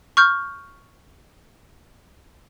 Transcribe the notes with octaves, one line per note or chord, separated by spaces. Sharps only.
C#6 F6 G6